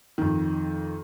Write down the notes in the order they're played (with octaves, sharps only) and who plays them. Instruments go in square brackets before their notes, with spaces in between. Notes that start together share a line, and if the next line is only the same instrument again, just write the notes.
[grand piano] F2 D#3